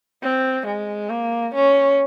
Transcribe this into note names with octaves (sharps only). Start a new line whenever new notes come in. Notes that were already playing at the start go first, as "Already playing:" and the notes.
C4
G#3
A#3
C#4